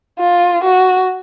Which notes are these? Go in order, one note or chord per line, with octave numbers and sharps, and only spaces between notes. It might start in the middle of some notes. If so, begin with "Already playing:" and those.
F4
F#4